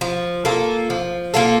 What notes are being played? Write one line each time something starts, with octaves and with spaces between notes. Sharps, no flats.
F3
A#3 F4 A4
F3
A#3 F4 A4